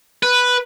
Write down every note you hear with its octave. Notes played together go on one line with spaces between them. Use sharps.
B4